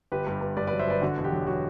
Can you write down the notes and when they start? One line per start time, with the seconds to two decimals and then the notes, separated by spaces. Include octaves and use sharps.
0.12 G1 G4 B4
0.27 G2
0.41 G2
0.57 G2 B4 D5
0.67 F#3 B4 D5
0.79 C5 E5
0.87 G1 B4 D5
1.02 D3 F#4
1.18 E1
1.24 G4
1.32 F#3
1.47 F#3 F#4